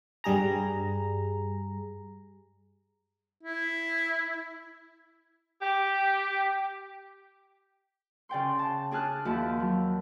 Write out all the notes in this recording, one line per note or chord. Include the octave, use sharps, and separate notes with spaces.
G2 G3 G#4 A#5
E4
G4
C#3 D5 G5 C6
A5
D4 G#4 A5 F6 F#6
D#2 F3 E4 F#4 A5
F#3